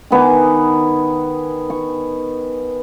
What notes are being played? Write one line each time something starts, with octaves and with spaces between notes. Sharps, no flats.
D#3 B3 G#5 D6
C#6